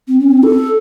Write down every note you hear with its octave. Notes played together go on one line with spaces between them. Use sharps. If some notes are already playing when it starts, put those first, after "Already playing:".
C4
C#4
C4
A4